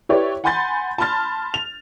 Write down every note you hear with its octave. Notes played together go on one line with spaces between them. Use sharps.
E4 G4 B4 C#5 D5
F#5 G#5 B5 C6 G6 A6
A5 B5 C6 F6 A6
F7